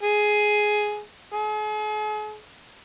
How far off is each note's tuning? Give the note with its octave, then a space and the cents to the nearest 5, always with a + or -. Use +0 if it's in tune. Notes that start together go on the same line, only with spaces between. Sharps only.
G#4 +10
G#4 +40